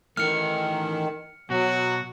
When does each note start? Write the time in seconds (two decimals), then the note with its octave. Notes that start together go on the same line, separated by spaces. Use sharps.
0.17 D#3 E3 A3 F6 C#7
1.50 B2 F#3 F#4